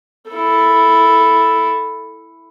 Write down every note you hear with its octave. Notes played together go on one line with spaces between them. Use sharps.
E4 A4